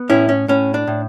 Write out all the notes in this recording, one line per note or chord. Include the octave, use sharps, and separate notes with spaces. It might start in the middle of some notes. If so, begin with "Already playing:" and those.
Already playing: B3
A2 C#4 E4
C#4
A2 C#4
D4
A2